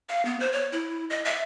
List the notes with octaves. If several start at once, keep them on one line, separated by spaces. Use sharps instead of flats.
F5
B3
C5
C#5
E4
D#5
E5